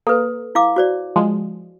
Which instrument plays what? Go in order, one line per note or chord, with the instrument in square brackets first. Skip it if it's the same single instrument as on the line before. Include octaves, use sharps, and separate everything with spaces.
[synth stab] A#3 [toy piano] A4 B4
[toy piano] E4 F5 D6
F#4 C5 D5
[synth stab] F3 G#3